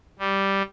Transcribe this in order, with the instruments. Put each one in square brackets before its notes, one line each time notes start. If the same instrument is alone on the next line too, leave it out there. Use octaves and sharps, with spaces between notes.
[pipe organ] G3